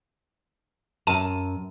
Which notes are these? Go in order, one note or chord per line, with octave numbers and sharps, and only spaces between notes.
F#2 A5 D#7